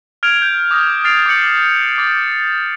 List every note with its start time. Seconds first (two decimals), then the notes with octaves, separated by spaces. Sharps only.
0.23 F6 G#6 D7 F7
0.42 G6
0.71 D6 D#6 G#6 A#6 F7
1.04 F6 G#6 A6 C7 D7 F7
1.26 D6 G6 C#7 F#7
1.98 D6 A6